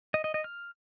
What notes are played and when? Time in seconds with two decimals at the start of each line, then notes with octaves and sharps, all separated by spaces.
0.14 D#5
0.24 D#5
0.34 D#5
0.44 F6